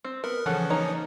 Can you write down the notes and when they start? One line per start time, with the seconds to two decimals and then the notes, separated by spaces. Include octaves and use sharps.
0.05 C4
0.24 B3 A#4
0.46 C#3 E3 F3 C#4 A4 F#5
0.70 A#3 D#4 C#5